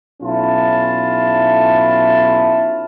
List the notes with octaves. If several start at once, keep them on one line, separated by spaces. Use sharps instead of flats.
B1 C#4 E4 F4 A5